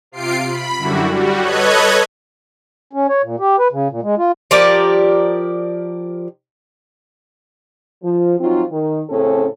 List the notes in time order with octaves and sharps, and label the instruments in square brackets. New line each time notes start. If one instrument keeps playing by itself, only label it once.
[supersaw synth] C3 F4 C7 D7
B5
F#2 D3 G3 E4 F#4
G3 F#4
A4 B4 C#5 D#5 F#6 G#6
[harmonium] C#4
C#5
A#2
G4
B4
C#3
A#2
G#3
F4
[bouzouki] F3 G4 A#4 D5
[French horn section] F3
F3 F#3 C4 D#4 F4
D#3
A2 C#3 C4 C#4 A4